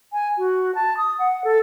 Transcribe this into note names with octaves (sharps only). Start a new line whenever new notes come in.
G#5
F#4
A5
D#6
F#5
A4